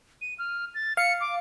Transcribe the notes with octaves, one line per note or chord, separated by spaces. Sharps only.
D#7
F6
A6
F5 C#7
D6